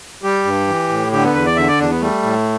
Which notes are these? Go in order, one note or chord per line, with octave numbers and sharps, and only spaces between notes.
G3 G4
G2
E3
A2
D3 G4
B3
E2 B4
D5
D3 E5
D5
E2 D4
B3
G3 A3
A2